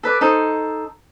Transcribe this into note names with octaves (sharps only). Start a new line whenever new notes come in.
A4 B4 D5
D#4 A4 C5